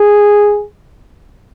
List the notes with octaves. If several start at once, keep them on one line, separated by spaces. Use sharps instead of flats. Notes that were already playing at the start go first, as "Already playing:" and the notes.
Already playing: G#4